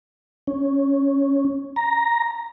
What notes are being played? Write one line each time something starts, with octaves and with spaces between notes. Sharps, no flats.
C#4
A#5